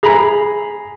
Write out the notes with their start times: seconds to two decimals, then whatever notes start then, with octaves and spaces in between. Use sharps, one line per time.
0.03 G#4 A#5 B5